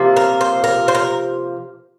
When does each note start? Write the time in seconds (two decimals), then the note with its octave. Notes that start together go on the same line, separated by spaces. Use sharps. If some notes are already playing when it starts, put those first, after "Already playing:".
Already playing: C3 F3 A#3
0.16 A#4
0.41 C5
0.64 A#4
0.88 C5
0.95 A#4